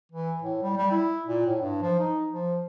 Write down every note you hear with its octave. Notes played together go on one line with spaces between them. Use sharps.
E3
A2
G3
G3
E4
A#2
A2
G2
F3
D#4
F3